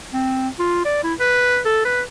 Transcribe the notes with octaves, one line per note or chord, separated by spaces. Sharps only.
C4
F4
D5
E4
B4
A4
B4